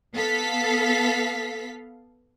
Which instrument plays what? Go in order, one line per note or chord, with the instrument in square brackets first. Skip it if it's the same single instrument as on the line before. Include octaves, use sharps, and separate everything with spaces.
[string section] B3 A4 F5 B6